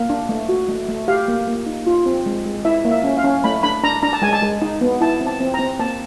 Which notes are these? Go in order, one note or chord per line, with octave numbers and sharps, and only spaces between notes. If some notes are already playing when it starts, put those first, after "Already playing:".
Already playing: A#3
D4
A3
F#4
A3
A3
G4 F5
A#3
A#3
D#4
F4
C4
G#3
G#3
E4 E5
A#3
E5
C#4
F5
C#4
A3 B5
D4 B5
D4 A#5
D4 A#5
A5
G#3 G#5
A5
G#3
D#4
B3
E4 A5
C4
A5
C4
A#5
C4
A#3 A5